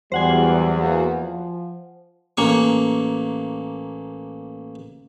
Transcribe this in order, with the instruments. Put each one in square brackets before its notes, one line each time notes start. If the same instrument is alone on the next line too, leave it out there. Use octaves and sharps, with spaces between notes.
[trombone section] E2 [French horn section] F#3 G3 [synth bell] C5 F#5 G#5
[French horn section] A#3 F#4
F3
[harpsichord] A1 A#3 C#6